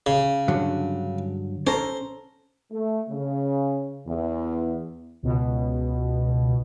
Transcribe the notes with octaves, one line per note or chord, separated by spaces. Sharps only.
C#3
G2 D3 F#3
C#4 A4 C5 A#5
A3
C#3
E2
C#2 B2